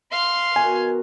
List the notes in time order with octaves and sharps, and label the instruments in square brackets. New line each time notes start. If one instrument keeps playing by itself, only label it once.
[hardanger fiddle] F5 C6
[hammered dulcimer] B2 D#3 F#4 [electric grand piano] G#5